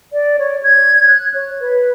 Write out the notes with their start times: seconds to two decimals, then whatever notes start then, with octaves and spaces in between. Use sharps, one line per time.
0.13 D5
0.39 C#5
0.63 G#6
1.08 F#6
1.34 C#5
1.60 B4